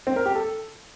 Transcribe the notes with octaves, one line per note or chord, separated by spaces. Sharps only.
C4
A#4
G4
A4